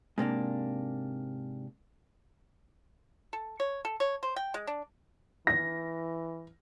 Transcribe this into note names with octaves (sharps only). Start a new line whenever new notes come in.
G#2 C3 A#3 D4
A4
C#5
A4
C#5
C5
G5
G#3
D4
E3 A#6